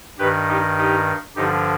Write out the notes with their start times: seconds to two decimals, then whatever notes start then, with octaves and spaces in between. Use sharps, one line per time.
0.18 G2 D#3 G4 B4
0.48 D#4 G4
0.77 D#4 G4
1.36 G2 D3 F3 D#4 G4